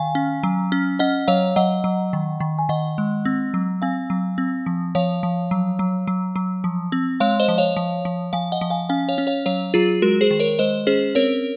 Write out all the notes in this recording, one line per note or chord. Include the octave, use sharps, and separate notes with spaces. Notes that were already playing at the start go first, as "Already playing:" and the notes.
Already playing: D#3 F5 G#5
C#4
F#3
C#4
C#4 D#5 F#5
F#3 C#5 F5
F#3 D#5 F#5
F#3
D#3
D#3
G#5
D#3 D#5 F#5
G#3
C4
F#3
C4 F5 G#5
F#3
C4
F3
F3 C#5 F5
F3
F#3
F#3
F#3
F#3
F3
C4
G#3 C#5 F5
C5 D#5
F3
C#5 F5
F3
F3
F3 F5 G#5
D#5 F#5
F3
F5 G#5
C#4 F5 G#5
C#5 F5
C#4
C#5 F5
F#3 C#5 F5
F#3 F4 G#4
G#3 F#4 A#4
G#4 C5
D#3
A#4 C#5
G#3 C5 D#5
C#4 G#4 C5
C4 A#4 C#5